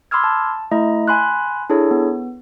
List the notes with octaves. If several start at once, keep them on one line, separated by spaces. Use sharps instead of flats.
B5 C6 D6 E6 F6 G#6
A5
A3 E4 D#5 A#5
G#5 B5 C6 F#6
D4 E4 G#4 A4 C#5
B3